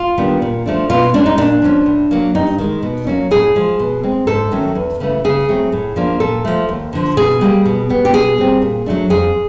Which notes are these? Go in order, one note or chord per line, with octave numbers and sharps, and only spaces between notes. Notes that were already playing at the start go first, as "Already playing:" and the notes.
Already playing: F4
D#3 G3 B3 D4
A#2
F3 A3 D4
B2 F4
G#3 C#4 D4
D#4
A#2 D4
F3 A#3 C#4
A2
F#3 A#3
G2 D#4
D#3 G#3
B2
F#3 A#3 C#4
A2 G#4
F3 G#3
B2
G#3 C4
G#2 A4
D#3 F#3 A3 C#4
E2
C#3 E3 A3
C#3 G#4
F#3 A3 C4
A2
F3 A#3 D4
A#2 A4
F3 A3
D#2
D3 F3
B2 G#4
G3 A#3
B2
G3 B3
G4
B2 G#4
G3 C4
A#2
F#3 A3 D4
F2 G#4